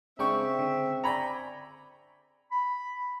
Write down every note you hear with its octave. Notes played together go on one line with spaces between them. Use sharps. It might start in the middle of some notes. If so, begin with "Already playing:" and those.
C#3 G#3 C4 D4 E5 G5 C#6
D3
D5 G5 G#5 A#5 B5 C#6
B5